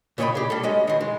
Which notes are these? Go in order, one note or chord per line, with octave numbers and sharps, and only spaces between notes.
A#2 C#3 C#5 D#5 G5 B5
G4 G#4
G3 A4
G#3 C#4 D#5
D#3 E3
G#3